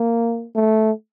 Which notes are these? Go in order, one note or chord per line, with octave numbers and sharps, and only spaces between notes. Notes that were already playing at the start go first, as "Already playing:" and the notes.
Already playing: A#3
A3